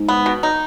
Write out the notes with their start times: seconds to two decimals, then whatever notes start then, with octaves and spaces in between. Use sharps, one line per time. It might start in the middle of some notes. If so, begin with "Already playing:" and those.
Already playing: G#2
0.09 B3
0.26 B2
0.43 D#4